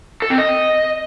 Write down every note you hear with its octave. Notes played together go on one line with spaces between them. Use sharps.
A4
C4
D#5